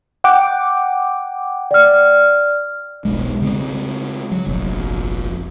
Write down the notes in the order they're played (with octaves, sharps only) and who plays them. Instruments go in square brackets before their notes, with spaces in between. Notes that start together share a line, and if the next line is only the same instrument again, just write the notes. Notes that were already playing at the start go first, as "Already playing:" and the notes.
[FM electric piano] F#5 G5 D6
[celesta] D5 F6
[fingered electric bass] E1 B1 G#3
C#3 G#3 C4
F#3
F1 A#1